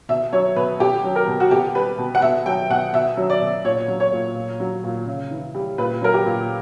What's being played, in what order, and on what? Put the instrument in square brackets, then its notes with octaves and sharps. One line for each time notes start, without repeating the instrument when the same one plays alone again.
[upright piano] B2 E5
F#3 C#5
B2 B4
B2 G4
F#3
A#4
B2
F#4
B2 G4
G3 B4
B2
F#5
B2 E5
F#3 G5
B2 F#5
B2 E5
F#3
D5
B2
A#2 C#5
F#3
C#5
A#2
A#2
F#3
A#2
C#3
E3
G3
A#2 B4
F#3 A#4
G4
A#2